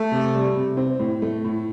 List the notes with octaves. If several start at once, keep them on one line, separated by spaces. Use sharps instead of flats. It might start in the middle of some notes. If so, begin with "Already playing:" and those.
Already playing: A3
C3
G3
C3
C4
A2
A3
A2